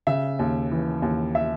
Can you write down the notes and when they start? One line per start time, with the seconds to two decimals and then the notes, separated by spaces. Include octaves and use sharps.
0.07 C#3 E5
0.39 D#2
0.71 E3
1.02 D#2
1.35 E5